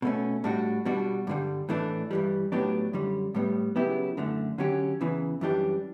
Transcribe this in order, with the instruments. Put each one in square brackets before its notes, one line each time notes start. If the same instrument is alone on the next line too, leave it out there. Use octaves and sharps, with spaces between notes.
[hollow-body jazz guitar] B2 A3 C#4
A2 G3 D4 F#4
B2 G3 D4 F#4
G2 D3 G3
A2 E3 A3 D4
G2 E3 G3
A2 F#3 B3 D4 G4
F#2 D3 G3
A2 G3 B3
C#3 F#3 B3 E4 G4
F#2 D3 A3
D3 F#3 C#4 G4
E2 C#3 E3
F#2 E3 G3 D4 G4